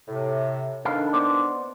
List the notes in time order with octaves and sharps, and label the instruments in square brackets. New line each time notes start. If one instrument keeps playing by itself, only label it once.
[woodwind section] A2 C3
[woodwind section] D#3 D4 [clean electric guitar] A4 B4 F5
[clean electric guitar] B3 C5 D5